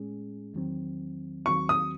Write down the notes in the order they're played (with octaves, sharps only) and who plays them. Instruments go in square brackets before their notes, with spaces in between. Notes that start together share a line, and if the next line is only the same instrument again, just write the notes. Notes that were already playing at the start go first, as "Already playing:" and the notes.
Already playing: [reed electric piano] A2 G#3 C#4 G#4
E2 D#3 F#3 C4
[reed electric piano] D#2 D#3 F#3 C4 F#4 [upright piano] C#6
[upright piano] D#6